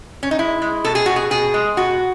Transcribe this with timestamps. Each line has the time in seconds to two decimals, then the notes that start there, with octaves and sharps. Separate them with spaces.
0.23 C#4
0.31 D#4
0.39 G#3 E4
0.62 G#3
0.84 B2 A4
0.95 G#4
1.06 B2 F#4
1.16 G#4
1.31 B2 G#4
1.54 G#3
1.77 B2 F#4